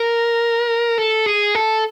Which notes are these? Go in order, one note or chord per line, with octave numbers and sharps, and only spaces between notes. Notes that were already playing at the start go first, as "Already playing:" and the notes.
Already playing: A#4
A4
G#4
A4